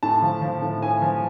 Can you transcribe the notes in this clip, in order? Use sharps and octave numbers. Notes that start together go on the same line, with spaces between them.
A2 A5
F3
F3
A2
A2 G#5
F3